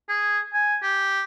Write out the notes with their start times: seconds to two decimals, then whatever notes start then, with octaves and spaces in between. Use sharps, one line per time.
0.09 G#4
0.53 G#5
0.82 G4